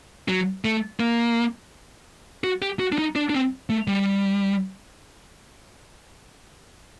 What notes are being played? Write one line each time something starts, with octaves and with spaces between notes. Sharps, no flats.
F#3
A3
A#3
F#4
G4
F#4
D4
D#4
D4
D4
C4
A3
G3